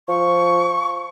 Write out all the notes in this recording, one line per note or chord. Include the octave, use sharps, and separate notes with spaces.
F3 C#6